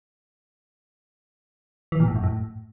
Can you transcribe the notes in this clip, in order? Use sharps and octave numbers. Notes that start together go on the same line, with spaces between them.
E3
A#2
A2
F#2
A2